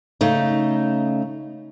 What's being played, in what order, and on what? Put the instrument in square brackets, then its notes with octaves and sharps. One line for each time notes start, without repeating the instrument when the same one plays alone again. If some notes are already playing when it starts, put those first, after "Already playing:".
[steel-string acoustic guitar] C#3 A3 D#4